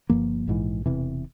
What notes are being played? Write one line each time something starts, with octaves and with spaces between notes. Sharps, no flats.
G1 G2 F3 A#3
A#1 G#2 E3
E1 E2 C3 E3